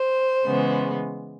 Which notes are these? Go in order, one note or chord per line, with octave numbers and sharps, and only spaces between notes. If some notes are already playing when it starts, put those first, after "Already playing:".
Already playing: C5
C#3 E3 G#3 B3